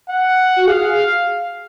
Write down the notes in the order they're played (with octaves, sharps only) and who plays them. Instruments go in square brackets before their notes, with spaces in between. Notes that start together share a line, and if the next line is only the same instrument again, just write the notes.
[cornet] F#5
[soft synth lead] F#4
[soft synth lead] G#4 [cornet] F5